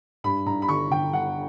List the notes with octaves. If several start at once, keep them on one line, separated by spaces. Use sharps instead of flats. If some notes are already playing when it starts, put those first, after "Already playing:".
G2 B5
G2 A#5
B5
G1 C#6
D3 G5
G1 F#5